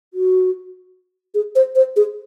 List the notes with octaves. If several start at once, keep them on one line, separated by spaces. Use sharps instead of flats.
F#4
G#4
C5
C5
G#4